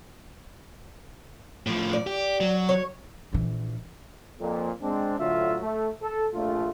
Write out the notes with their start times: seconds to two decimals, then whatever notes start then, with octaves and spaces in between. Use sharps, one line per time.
1.67 A2 F3
1.93 D5
2.07 G4
2.40 F#3
2.69 C#5
3.33 A#1 E3
4.41 F2 A#2
4.82 G#3 C4 D4
5.19 D2 A2 D3 F#3 F4 E5
5.62 A3
6.02 A4
6.34 A#1 A3 F4